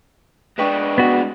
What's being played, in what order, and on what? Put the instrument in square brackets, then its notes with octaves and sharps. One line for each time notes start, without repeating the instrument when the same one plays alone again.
[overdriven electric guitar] G#3 D4 [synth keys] B4 G5 C#6
[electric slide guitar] B3 F#4